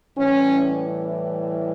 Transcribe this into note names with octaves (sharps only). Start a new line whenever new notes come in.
A2 E3 G3 C#4